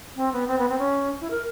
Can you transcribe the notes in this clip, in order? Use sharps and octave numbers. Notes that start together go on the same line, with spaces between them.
C4
B3
C4
B3
C4
C#4
E4
A#4